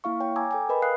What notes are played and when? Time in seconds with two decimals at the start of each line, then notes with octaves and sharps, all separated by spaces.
0.04 A#3 E4 F5 C#6
0.20 C#5 G5
0.36 G#5 A#5 D6 E6 G#6
0.51 A4 G5 G#5
0.69 A#4 B4 D#5 B5
0.82 F5 D#6 F#6 C7